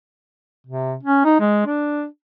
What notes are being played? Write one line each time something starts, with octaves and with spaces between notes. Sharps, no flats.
C3
C#4
D#4
G#3
D4